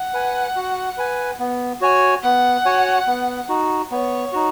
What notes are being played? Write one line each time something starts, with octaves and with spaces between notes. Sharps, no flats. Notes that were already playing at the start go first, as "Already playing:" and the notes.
Already playing: F#5
B4 G#5
F#4
B4 G#5
B3
F#4 C#5 G#5
B3 F#5
F#4 C#5 G#5
B3
D#4 F#4
B3 C#5
D#4 F#4